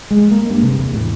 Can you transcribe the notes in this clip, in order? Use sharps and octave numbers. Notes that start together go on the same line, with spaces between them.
G#3
A#3
G2
C3
E2
A2